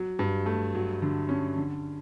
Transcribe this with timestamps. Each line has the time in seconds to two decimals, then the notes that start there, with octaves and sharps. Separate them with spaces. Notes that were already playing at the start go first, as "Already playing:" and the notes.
Already playing: F#3
0.19 G2
0.46 A3
0.75 F#3
1.02 D3
1.29 C#4
1.57 D3